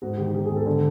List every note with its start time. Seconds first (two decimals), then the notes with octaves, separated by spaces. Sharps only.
0.02 G#2 F#4
0.17 D#3 G4
0.34 D#3 G4
0.45 G#4
0.50 G#2
0.55 A4
0.66 D3